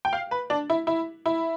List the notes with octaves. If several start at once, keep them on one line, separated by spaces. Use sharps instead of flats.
G5
F5
B4
D4
E4
E4
E4